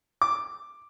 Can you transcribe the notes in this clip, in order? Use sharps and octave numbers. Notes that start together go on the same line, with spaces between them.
D6